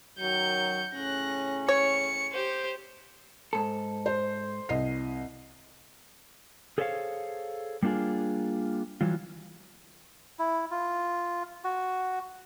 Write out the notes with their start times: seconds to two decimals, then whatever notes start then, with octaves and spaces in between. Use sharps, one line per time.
0.19 F#2 D#3 F#3 G6 C#7
0.94 A2 C#3 C#4 F#6 A#6
1.68 C#5 C#7
2.33 G4 C5
3.53 G#2 A4
4.06 C5
4.69 C2 D#5 C7
6.78 G#4 A4 C5 C#5 E5 F5
7.83 G3 A#3 D4 F4 G#4
9.01 E3 F#3 G3 F4
10.39 E4
10.71 F4
11.64 F#4